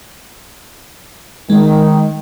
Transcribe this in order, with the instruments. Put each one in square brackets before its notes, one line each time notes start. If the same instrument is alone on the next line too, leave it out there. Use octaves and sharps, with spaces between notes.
[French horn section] D#3 [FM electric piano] G#3